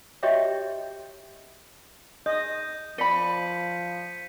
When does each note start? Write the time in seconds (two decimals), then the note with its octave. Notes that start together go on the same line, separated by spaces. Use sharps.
0.23 F#4 G4 C#5 D#5 E5 G5
2.26 D#5 G6
2.98 F3 D5 B5 B6 C#7 D#7